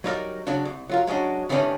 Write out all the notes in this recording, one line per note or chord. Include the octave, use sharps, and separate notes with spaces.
F#3 G3 D#4 E4 A#4 D5
C#3 F#3 D4
C2
F#3 F4 A#4
F#3 G#3 C#4 D4 F#4
A2 D#3 E3 G3 C#4 D4